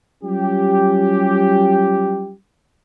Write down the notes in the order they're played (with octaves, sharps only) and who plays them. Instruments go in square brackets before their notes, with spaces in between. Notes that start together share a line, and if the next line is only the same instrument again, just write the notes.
[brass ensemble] F#3 G3 C#4 F4 G4